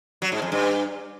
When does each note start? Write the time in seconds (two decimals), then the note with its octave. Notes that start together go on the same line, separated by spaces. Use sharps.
0.22 F#3
0.32 G#2
0.42 F2
0.52 G2